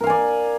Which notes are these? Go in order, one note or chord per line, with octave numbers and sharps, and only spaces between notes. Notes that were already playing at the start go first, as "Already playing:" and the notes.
A#4 D5 F5 G#5